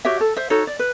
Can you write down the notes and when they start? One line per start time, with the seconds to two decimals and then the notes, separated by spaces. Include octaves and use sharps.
0.05 F#4 G4 C#5 E5
0.20 A4
0.37 C5 E5
0.50 D#4 F#4 A4 C#5
0.67 D5
0.79 B4